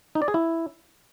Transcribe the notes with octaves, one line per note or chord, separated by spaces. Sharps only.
D#4
D5
G#4
E4